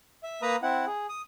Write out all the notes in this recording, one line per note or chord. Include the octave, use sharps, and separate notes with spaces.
E5
A#3 B4 A#5 B5 D#6
C4 E4 F#5
G#4
D#6